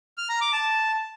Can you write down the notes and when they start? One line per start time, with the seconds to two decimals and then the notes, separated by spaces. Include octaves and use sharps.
0.17 F6
0.29 A#5
0.41 D6
0.53 A5